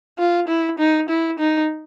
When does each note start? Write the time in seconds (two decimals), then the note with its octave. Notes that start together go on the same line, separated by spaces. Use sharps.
0.19 F4
0.48 E4
0.78 D#4
1.09 E4
1.39 D#4